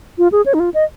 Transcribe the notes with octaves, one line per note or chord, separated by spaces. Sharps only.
F4
G#4
C#5
D#4
F4
D#5